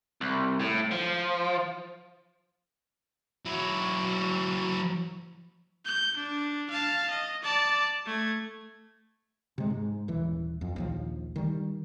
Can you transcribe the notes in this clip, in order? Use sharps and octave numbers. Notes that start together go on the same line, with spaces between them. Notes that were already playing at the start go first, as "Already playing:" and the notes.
C2
A2
F3
F#3 E4
G6
D4
F5 A5
D#5
D5 A5
A3 G#6
C3 G#3
G#2
D#1 E3
F2
A#1 D#2 F3
D#3 G3